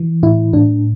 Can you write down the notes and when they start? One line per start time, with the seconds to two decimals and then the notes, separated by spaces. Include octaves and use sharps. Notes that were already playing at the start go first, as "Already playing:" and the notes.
Already playing: E3
0.23 A2 E4
0.53 A2 D4